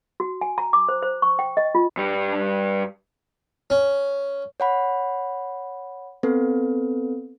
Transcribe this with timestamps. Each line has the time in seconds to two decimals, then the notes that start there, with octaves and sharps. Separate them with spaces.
0.20 F#4
0.41 G#5
0.58 A#5
0.73 D6
0.89 C5
1.02 C5
1.22 C#6
1.39 G5
1.57 D#5
1.75 F4
1.97 G2 G3
3.70 C#4
4.60 C#5 F#5 B5
6.23 B3 C4 A4 B4